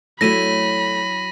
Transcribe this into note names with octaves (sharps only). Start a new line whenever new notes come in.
F#3 A3 E4 A4 D5 B5 A#6 D#7